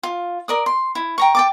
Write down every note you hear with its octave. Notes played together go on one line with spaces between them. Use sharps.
F4
A#4 D5 D#6
C6
E4
G5 A#5 C#6
G5 A5 D6